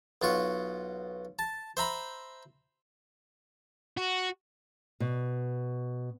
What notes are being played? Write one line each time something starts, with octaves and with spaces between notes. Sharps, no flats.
B1 F4 F#4 C#6
A5
C5 E5 A#5 B5
F#4
B2